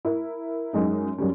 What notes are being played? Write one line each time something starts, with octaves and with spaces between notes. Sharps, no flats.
E4 A#4
F#2 G#3 D#4
F#2 G3 C#4